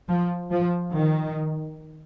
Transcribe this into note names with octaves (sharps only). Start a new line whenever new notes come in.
F3
F3
D#3